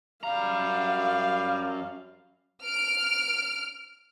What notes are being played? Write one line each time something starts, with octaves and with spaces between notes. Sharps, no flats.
F#2 G3 F5 A#5
F6 D7